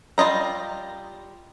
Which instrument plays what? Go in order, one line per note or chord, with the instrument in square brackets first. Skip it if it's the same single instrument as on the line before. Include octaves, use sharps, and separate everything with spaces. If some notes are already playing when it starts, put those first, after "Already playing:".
[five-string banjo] G3 F4 D#5 A#5